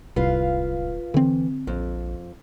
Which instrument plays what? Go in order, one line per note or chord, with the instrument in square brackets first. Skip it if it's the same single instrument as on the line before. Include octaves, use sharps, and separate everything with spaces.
[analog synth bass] D1 [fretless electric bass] C2 [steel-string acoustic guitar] F4 B4 F5
[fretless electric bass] D3 C4 [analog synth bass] E3
[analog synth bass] A#1 [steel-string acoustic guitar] F2